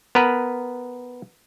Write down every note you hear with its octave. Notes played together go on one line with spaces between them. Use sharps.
B3 A#4 B4